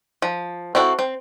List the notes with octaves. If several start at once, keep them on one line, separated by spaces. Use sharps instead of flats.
F3
C4 E4 F#4 A4
C4